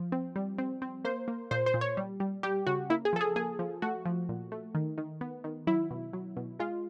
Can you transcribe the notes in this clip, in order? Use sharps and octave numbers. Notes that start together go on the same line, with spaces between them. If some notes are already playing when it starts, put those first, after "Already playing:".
Already playing: F3
C4
G3
C4
C4
A#3 C5
A#3
A#2 C5
C5
A#2
C#5
G3
G3
G3 G4
C#3 F#4
A#3 E4
G#4
F3 A4
G#4
A#3 G#4
F3
A3 F#4
F3
A#2
A3
D#3
D#3
B3
D#3
F#3 E4
B2
F#3
B2
G#3 F4